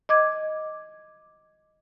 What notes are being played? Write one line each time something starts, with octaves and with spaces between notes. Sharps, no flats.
D#5 D6 G#6